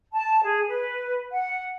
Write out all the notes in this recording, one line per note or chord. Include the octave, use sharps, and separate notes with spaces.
A5
G#4
B4
F#5